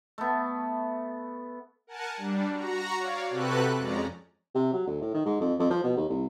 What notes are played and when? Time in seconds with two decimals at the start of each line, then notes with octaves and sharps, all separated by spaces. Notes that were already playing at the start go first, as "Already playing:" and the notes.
0.18 A3 B3
1.87 A#4 F#5 G#5 A5
2.17 G3 D4
2.53 F#4 A#5
2.98 C#5 D5 F5
3.30 C3 F#4 G4 A4 B4 F#6
3.78 F2 G#3 C#4 D5 A#5
4.55 C3
4.73 F#3
4.87 D2
5.01 A2
5.14 D#3
5.26 G#2
5.41 F2
5.59 F2
5.70 F3
5.83 B2
5.97 D#2
6.09 C2